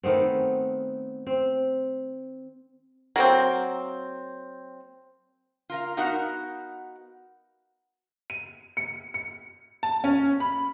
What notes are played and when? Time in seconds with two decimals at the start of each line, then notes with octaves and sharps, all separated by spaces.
0.03 D#3 A3 B3 C4
1.27 C4
3.16 F#3 A#3 C4
5.69 F4 A#4 F5
5.97 B3 D#4 F#4 A#4 F5 F#5
8.30 D#7
8.77 C#7
9.14 C#7
9.83 A5
10.04 C#4
10.40 B5